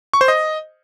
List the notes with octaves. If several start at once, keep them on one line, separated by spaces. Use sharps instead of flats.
C#6
C5
D#5